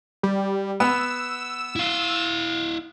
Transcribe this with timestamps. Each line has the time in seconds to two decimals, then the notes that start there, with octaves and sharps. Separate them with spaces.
0.23 G3
0.80 B3 E6
1.76 E4 F5